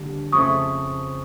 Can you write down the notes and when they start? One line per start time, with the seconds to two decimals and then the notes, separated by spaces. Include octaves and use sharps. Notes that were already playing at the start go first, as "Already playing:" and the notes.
Already playing: D#2 D3 G3
0.32 F2 C#3 F3 A3 C#6 D#6